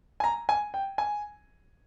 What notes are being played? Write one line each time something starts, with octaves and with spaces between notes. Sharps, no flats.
G#5
A#5
G#5
G5
G#5